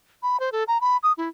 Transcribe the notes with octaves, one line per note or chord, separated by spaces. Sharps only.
B5
C5
A4
A#5
B5
D#6
E4